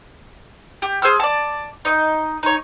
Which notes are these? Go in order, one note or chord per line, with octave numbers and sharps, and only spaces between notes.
G4
G#4 C5 E6 F6
D5 A5
D#4 D#5
D#4 C#5